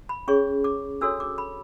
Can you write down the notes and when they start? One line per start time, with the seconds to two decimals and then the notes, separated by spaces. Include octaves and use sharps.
0.09 B5
0.28 C#4 G#4 C#5 C#6
0.64 D6
1.01 D4 F#4 A4 C#5 E6
1.20 D6
1.38 B5